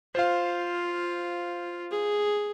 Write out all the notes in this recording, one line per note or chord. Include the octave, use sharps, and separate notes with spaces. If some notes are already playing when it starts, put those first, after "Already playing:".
F4 C5 F5
G#4